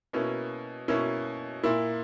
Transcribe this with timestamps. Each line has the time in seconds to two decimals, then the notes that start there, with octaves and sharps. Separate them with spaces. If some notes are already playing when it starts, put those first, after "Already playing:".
0.13 B2 A#3 C#4 E4
0.88 B2 A#3 C#4 E4
1.64 A#2 A#3 E4